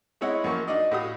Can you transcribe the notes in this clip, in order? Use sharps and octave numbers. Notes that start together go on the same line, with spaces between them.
G#3 C4 E4 C#5 D#5 F#5
F#2 F3 A#3 C#6
D4 D#4 F#4 D5 D#5
A2 F#4 G4 F5 D#6